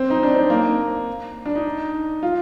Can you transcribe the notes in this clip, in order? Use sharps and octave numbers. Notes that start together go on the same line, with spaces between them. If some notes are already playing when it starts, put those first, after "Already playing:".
Already playing: C4
D#4
D4
C4
A#3
D4
D#4
F4